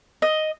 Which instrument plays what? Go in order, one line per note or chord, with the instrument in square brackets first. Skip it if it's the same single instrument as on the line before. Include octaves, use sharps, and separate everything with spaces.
[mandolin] D#5